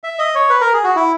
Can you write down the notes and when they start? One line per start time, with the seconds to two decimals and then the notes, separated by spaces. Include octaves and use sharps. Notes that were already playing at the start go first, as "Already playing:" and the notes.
0.04 E5
0.19 D#5
0.35 C#5
0.50 B4
0.61 A#4
0.73 G#4
0.84 F#4
0.96 E4